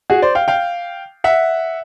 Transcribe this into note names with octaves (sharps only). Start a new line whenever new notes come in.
F#4 G#4
C5 D5
F5 G5
F5 G5
E5 F#5